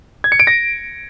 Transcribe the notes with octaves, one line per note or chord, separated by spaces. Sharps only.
G#6
C#7
D7
A#6